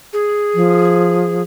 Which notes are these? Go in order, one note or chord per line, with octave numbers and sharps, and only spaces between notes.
G#4
F3